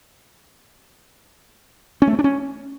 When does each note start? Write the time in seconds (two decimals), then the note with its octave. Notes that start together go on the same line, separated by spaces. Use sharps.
2.02 C#4
2.07 A3
2.13 C4
2.19 D4
2.24 C#4